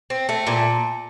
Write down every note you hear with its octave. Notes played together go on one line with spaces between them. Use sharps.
C4
A3
A#2